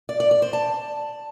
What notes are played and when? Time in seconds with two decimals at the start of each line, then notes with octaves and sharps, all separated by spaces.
0.09 D5
0.20 D5
0.31 D5
0.42 C5
0.53 A5